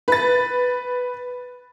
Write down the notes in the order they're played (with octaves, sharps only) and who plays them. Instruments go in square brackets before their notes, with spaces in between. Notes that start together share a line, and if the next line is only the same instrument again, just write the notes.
[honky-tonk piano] B4 A6